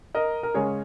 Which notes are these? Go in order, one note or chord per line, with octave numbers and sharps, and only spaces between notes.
A#4 D#5
A#4
C#3 G#3 C#4 G#4 C#5